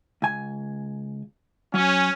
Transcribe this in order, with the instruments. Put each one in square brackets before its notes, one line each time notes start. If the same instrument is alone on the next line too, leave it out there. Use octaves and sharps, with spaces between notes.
[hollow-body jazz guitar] C#2 G#5
[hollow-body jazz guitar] F#3 [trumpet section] C#4